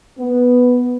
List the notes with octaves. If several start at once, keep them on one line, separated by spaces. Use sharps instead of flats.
B3